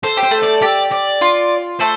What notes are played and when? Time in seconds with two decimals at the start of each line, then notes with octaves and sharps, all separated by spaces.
0.03 A4 C5
0.17 G4
0.24 C5
0.31 A3 A4
0.43 D5
0.62 G4 D5
0.92 D5
1.21 F4
1.80 A3 A4 C5